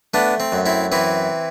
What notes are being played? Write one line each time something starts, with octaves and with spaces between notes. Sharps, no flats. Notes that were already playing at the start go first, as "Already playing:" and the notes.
A3 B3 D4
C4
F#2
C4 E4
E3 C4 E4